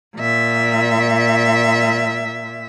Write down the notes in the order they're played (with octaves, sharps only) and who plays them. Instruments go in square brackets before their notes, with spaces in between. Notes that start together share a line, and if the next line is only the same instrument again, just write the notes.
[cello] A#2 E5